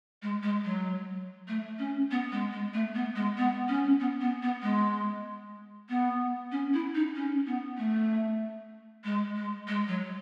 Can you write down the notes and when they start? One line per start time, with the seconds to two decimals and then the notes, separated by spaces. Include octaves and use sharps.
0.22 G#3
0.43 G#3
0.64 F#3
1.48 A3
1.79 C#4
2.11 B3
2.32 G#3
2.52 G#3
2.74 A3
2.95 B3
3.15 G#3
3.37 B3
3.69 C#4
4.00 B3
4.20 B3
4.42 B3
4.62 G#3
5.89 B3
6.51 C#4
6.73 E4
6.94 D#4
7.15 C#4
7.46 B3
7.78 A3
9.04 G#3
9.36 G#3
9.67 G#3
9.88 F#3